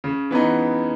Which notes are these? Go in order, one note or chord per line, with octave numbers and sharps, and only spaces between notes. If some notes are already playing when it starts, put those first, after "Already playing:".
C#3
E3 B3 D#4